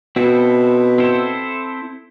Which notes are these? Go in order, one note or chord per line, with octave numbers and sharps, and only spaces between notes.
B2 C4 E4 A4 C5
C4 E4 A4 C5